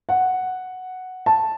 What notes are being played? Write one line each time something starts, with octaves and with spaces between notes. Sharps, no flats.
F#5
A5